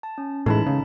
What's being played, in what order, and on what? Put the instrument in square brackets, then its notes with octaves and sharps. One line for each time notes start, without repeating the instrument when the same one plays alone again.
[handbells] A5
C#4
[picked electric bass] A2 E3 G#3 [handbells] D#4 A5 B5
[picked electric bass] C#3